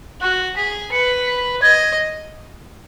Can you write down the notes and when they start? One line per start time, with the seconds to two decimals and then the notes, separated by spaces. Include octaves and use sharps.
0.20 F#4 F#6
0.56 G#4 B6
0.92 B4 C#7
1.26 B6
1.62 D#5 G#6